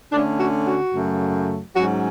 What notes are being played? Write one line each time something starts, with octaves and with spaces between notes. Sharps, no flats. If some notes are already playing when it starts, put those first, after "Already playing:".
D3 A3 C#4 D4
F#4
F#4
F#2 C#3 F#3 A3
G#2 F#3 C#4 F#4